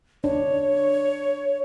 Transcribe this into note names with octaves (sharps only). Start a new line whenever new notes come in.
D4 C#5